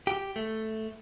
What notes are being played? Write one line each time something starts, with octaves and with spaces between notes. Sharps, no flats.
G4
A3